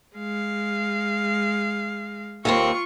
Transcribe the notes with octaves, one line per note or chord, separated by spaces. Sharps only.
G#3 F5
D#2 A#3 C4 F4 C#6